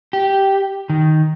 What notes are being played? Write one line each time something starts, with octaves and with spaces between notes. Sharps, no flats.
G4
D#3